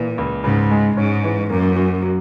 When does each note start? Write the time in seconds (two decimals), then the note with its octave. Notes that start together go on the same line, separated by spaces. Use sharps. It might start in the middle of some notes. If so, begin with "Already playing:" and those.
Already playing: A#2 E3
0.18 C#2
0.44 G#2 C#3
0.71 G#3
0.97 G#2 C#4
1.24 E3
1.50 F#2 A#3
1.76 F#4
2.02 F#3